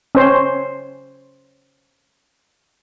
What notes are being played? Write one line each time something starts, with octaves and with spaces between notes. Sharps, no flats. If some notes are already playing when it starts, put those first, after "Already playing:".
C#4 C5